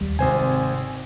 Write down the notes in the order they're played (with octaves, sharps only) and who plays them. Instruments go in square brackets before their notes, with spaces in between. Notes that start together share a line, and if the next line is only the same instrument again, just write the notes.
[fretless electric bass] D#2 G3
[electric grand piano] G#1 C5 G#5 [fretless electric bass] C3